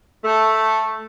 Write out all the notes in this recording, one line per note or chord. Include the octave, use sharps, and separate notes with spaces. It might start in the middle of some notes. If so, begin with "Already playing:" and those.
A3